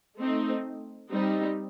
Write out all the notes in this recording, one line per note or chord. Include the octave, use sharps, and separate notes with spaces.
A3 C4 D#4
G3 C4 D#4